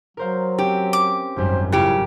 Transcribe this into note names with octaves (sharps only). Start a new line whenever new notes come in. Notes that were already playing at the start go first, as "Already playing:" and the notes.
F#3 A#4 C5 F5
C4 C#4 G4
D6
G#1 F#2 G3 C5
C#3 E4 F4 G4 A#4